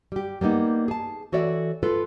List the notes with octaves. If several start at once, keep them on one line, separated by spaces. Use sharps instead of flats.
G3 G4
G3 A#3 B3 D#4
G#4 A5
E3 F#4 A4 C#5 D5 E5
F4 A4 B4